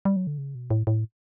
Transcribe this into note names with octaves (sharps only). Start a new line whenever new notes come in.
G3
F#3
D3
C#3
B2
A2
A2